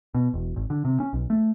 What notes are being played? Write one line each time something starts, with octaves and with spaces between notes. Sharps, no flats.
B2
E1
G#1
D3
C3
C#4
B1
A3